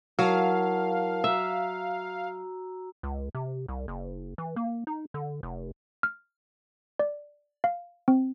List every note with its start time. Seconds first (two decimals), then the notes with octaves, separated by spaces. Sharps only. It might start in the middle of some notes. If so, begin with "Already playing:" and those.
0.19 F#3 E4 A#4 F5 A5
1.24 F#4 E5 A#5 E6
3.03 C#2
3.35 C3
3.68 C2
3.88 F#1
4.38 E3
4.56 A#3
4.87 D#4
5.14 D3
5.43 F1
6.03 F6
6.99 D5
7.64 F5
8.08 C4